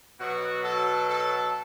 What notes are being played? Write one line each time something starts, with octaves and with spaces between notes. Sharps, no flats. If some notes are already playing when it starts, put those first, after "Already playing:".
B2 F#3 F#4
A4
A4